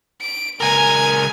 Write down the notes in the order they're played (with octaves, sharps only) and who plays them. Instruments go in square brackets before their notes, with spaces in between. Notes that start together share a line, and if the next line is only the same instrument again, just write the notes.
[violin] D7
[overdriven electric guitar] C#2 A#4 [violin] G#5